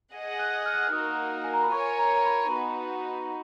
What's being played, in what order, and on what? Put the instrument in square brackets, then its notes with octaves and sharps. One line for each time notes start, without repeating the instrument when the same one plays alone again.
[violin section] G#4 D#5 F#5
[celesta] F#6
F6
F#6
F6
[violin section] A#3 D#4 F#4 A#4 [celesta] D#6
[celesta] G#5
A#5
B5
[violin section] F4 A#4 C#5 G#5 [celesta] C#6
[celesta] A#5
A#5
B5
[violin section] B3 D#4 F#4 [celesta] B5